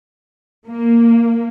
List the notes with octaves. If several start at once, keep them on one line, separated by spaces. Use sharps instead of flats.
A#3